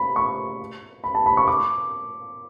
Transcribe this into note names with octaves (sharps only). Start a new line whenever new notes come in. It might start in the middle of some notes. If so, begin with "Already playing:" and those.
Already playing: B5
C#6
B5
A5
B5
C#6
D6